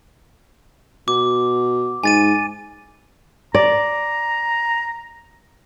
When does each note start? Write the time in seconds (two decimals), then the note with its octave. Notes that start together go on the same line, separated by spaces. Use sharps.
1.08 B2 D6
2.03 G#2 G#5 A6 D#7
3.55 D5 A#5